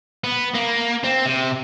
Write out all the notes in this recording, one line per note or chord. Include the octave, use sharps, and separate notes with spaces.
B3
A#3
C4
C3